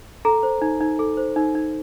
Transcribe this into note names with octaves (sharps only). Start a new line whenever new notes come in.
A4 A#5
C5
D#4
D#4
A4
C5
D#4
D#4